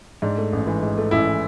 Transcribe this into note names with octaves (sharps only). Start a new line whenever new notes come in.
G#2 D4
A3
A1
E3
G#2
A3
A1 E4
E3